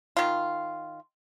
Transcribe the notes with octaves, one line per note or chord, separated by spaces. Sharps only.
D#3 F4